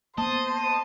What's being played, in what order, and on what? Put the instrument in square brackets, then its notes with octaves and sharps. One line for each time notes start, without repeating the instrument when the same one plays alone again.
[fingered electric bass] A#3 B3 [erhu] C5 [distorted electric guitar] D#5 [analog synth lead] A5